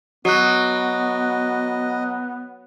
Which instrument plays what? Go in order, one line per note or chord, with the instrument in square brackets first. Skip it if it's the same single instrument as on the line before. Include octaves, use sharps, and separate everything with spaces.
[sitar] F#3 [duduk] B3 [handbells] F#4 F#6 [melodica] D#5